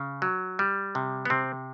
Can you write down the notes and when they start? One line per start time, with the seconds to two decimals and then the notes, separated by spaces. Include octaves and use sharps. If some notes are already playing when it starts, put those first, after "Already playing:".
Already playing: C#3
0.22 F#3
0.59 G3
0.95 C3
1.25 B3
1.30 C3 C4